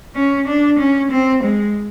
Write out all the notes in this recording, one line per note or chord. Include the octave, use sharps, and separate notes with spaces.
C#4
D4
C#4
C4
G#3